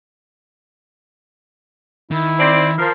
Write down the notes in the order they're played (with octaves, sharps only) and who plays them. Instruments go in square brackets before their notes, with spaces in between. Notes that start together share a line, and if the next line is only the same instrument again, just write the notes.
[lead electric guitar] D#3 [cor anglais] E4
[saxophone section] C4 D5
F3 A#4